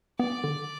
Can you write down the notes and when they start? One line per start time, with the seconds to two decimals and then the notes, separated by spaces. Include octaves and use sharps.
0.20 B3 D5
0.44 D3